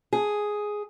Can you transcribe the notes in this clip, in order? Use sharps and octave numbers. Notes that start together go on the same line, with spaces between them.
G#4